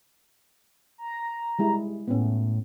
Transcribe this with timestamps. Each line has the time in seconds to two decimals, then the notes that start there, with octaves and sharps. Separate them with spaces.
0.98 A#5
1.59 G3 G#3 E4
2.08 A2 B3 C#4